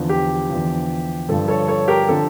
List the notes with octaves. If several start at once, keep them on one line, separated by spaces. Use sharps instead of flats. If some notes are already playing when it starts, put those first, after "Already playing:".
Already playing: E2 D3 F3
G4
E2 D3 F3
G2 D3 F3 A4
A4 C#5
A4 C#5
G4 A#4
D3 F3 A4